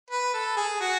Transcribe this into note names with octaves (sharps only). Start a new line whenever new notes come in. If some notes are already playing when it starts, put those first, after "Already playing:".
B4
A4
G#4
F#4